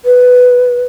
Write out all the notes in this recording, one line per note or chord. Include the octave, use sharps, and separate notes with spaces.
B4